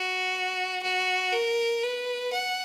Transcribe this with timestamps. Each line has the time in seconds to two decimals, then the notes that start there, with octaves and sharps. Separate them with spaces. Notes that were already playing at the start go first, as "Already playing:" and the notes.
Already playing: F#4
0.83 F#4
1.33 A#4
1.83 B4
2.33 F#5